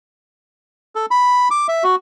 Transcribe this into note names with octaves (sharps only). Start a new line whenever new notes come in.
A4
B5
D6
E5
F#4